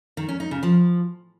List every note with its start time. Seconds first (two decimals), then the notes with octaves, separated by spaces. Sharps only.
0.17 D#3
0.29 C#4
0.40 D#4
0.51 C#3
0.63 F3